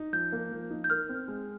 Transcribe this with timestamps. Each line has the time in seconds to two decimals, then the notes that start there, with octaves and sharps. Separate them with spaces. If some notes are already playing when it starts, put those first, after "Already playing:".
Already playing: D#4
0.13 F3 G6
0.32 A#3
0.51 F3
0.71 D#4
0.84 G6
0.90 A#4 F6
1.09 C4
1.28 G#3